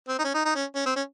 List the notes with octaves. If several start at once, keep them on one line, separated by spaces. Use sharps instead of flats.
C4
D#4
C#4
D#4
D#4
C#4
C#4
C4
C#4